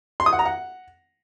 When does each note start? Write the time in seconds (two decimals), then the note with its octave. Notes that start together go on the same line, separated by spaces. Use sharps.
0.20 C6
0.26 D#6
0.33 F#5
0.39 A#5
0.45 F#5